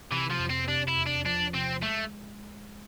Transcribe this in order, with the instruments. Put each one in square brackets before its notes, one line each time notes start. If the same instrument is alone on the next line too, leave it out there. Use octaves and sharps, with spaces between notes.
[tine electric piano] C3 [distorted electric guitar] E3
[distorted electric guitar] F3
[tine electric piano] F2
[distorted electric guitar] C4
[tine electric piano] C3 [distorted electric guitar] D4
[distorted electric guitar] E4
[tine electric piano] E2
[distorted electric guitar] D4
[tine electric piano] F3 [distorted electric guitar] D4
[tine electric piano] C3 [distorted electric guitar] C4
[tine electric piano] G#3 [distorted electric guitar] A3